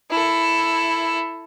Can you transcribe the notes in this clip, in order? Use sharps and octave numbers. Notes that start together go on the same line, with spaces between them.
E4 A4